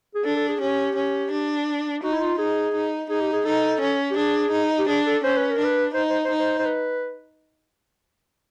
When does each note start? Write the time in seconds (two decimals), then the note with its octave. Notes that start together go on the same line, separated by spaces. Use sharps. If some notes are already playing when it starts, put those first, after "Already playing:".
0.15 G#4
0.25 D4 A4
0.37 A4
0.49 G#4
0.60 C#4 G4
0.96 C#4
1.32 D4
2.03 D#4 F#4
2.13 E4
2.21 F4
2.39 D#4 G#4
2.75 D#4
3.10 D#4 G#4
3.21 G4
3.33 G#4
3.45 D#4 A4
3.82 C#4
4.11 G4
4.17 D4 G#4
4.52 D#4
4.78 G4
4.88 D4 G#4
5.06 A4
5.24 C#4 C5
5.37 B4
5.51 A#4
5.59 D4
5.64 B4
5.94 D#4 C5
6.10 C5
6.24 C5
6.31 D#4
6.40 C5
6.59 C5
6.66 B4